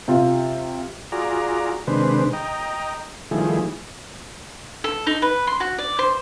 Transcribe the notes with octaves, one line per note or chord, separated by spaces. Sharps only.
C3 F4
F4 F#4 G#4 D5 A#5
C3 D#3 G#3 D4 B4 C5
D#5 G5 A#5
D#3 F3 G3 A3 E4 G#4
A4
D#4
B4
C6
F#4
D5
C5